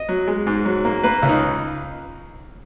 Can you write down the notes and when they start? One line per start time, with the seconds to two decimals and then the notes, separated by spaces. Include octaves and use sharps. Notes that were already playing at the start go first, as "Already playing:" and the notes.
Already playing: D#5
0.09 F#3
0.28 G#3
0.47 G#2
0.66 F#3
0.85 A#3
1.03 A#3 B4
1.22 C#2
1.29 D#4